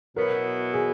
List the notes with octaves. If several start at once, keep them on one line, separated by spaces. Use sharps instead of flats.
B2 F#3 B3 E4 A#4
G#4